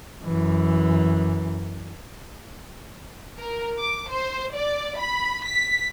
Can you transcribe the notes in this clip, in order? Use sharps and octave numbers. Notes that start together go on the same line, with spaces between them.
F#2 E3
A#4
D6
C5
D5
B5
B6